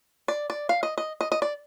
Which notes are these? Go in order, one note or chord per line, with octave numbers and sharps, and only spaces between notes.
D5
D5
F5
D#5
D#5
D#5
D#5
D5